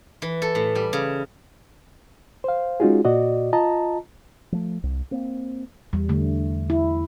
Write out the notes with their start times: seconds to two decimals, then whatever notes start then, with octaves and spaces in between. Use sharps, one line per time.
0.22 E3
0.42 A4
0.55 A2
0.75 G3
0.93 C#3
2.44 C5 F5
2.80 G#3 C#4 D#4 F4 F#4 G#4
3.05 A#2 F#4 D5 D#5
3.53 F4 D#5 A5 A#5
4.52 F3 A3
4.83 C2
5.11 A#3 C4
5.93 E2 G3
6.09 D3 A3
6.70 E4